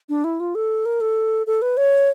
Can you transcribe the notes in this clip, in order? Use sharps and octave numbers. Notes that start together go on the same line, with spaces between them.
D4
E4
F4
A4
A#4
A4
A4
B4
C#5